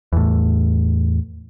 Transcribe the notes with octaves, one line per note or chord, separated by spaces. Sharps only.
E2 A2